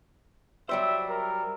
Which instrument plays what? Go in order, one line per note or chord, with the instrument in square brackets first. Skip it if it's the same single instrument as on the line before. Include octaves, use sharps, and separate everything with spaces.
[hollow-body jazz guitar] F#3 G3 C5 [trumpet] E5
[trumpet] A#4